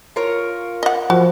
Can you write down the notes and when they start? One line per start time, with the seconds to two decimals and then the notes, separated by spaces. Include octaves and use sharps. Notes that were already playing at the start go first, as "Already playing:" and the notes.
0.16 F4 A#4 C#5
0.83 D#5 F#5
1.10 F3 F#4